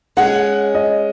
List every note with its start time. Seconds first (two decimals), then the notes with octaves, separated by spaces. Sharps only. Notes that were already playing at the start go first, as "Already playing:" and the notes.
0.17 G#3 C#4 G#4 F#5
0.75 D#5